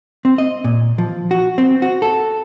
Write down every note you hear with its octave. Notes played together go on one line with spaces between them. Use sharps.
C4
D#5
A#2
F3
F#4
C4
F#4
A4